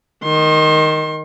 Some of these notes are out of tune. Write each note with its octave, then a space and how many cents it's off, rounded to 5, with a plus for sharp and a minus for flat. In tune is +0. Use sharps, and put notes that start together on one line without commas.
D#3 +0 C6 +35